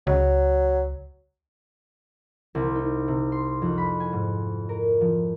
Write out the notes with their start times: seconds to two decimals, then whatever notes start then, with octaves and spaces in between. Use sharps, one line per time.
0.07 C#2 F#3
2.55 C2
2.75 D#4
3.08 C3
3.32 C6
3.62 F2
3.78 B5
4.00 G#5
4.13 G#2
4.69 A#4
5.01 F3